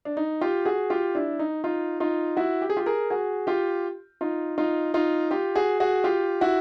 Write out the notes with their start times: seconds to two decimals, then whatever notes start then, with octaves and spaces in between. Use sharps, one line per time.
0.05 D4
0.17 D#4
0.41 F4 G4
0.65 F#4 G#4
0.90 F4 G4
1.15 D4 E4
1.39 D#4
1.64 D#4 F4
2.00 D#4 F4
2.37 E4 F#4
2.62 G4
2.70 G#4
2.76 F4 G4
2.86 G#4 A#4
3.10 F#4 G#4
3.47 F4 G4
4.21 D#4 F4
4.58 D#4 F4
4.94 D#4 F4
5.31 F4 G4
5.55 F#4 G#4
5.80 F#4 G#4
6.04 F4 G4
6.41 E4 F#4